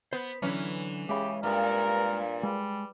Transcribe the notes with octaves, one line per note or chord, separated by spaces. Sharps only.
B3 C5
D3 E3 F#3 C#4
C#3 G#3 G4 E5 B5
G2 A#2 A#4
G3 G#3